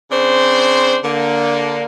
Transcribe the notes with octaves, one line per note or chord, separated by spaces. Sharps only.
C#3 C4 D4 C5
D3 A#3